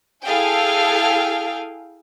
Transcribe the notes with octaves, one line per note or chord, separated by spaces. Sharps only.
E4 G#4 A4 F5 G5 G#5